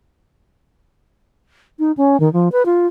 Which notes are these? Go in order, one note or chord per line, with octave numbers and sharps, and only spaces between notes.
D#4
C#4
D#3
F3
B4
F4